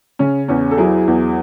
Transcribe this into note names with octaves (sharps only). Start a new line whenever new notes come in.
C#3 C#4
E2 C#4
A4
F#3 E4 G#4
E2